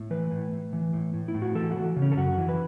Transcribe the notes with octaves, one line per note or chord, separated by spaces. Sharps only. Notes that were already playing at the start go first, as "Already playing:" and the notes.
Already playing: A2
E3 B4
A2
A2
E3
A2
A2
E4
A2
F#4
E3 A4
F#4
E3
C#3
C#4
A4
F#2 F#4
E3
B4